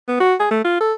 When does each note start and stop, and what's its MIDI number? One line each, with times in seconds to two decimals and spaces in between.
0.08 0.16 59
0.20 0.35 66
0.40 0.50 68
0.51 0.63 57
0.64 0.76 65
0.81 0.94 69